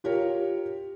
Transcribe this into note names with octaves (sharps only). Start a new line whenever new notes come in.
F4 G4 A#4 C#5